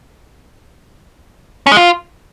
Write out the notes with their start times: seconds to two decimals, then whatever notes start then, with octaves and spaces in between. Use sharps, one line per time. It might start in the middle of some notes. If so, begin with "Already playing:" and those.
1.67 C#4
1.72 G#3
1.77 F4